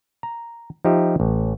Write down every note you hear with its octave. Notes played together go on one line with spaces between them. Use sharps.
A#5
F3 D#4 G4 E5
A1